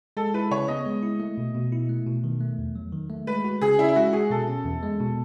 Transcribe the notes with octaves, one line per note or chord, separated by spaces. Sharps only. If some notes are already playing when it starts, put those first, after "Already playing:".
G#3 A4
E4 B4
C#3 C#5
B3 D#5
G#3
E4
A3
B2
B2
E4
A3
B2
D#3
A3
E2
F#3
D#3
A3
G#3 B4
F#4
C#3 G#4
C#4 E4
E4
G#3 F#4
F#4 G#4
B2 A4
C#4
E2
G#3
B2